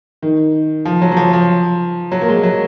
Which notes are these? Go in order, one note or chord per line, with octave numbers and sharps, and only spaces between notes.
D#3
F3
F#3
F#3
F3
F3
F#3
A#3
G#3
F#3